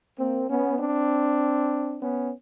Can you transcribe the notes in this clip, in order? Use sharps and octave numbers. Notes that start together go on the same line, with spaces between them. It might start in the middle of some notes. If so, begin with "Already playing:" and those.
A#3 C4
B3 C#4
C4 D4
B3 C#4